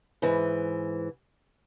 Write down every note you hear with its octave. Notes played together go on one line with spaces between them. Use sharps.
G#2 E3